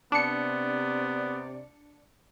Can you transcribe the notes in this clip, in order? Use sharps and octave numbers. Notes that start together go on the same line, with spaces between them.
C3 B3 D4 D5 C#7